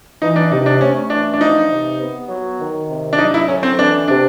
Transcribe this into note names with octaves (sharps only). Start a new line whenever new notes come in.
E3 D#4
D4
C3 D#4
D4
A3 C#4
E3 D4
D4
F3 D#4
C3
B3
F#3
D#3
C3
D4
F#3 D#4
E4
D3 C#4
C4
E3 D4
C3 D4